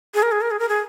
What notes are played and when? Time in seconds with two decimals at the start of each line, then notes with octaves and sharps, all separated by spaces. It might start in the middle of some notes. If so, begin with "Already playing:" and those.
0.14 G#4
0.23 A#4
0.32 G#4
0.41 A#4
0.51 G#4
0.59 A#4
0.69 G#4